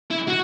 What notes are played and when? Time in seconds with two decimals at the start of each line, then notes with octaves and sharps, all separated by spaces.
0.11 E4
0.28 F#4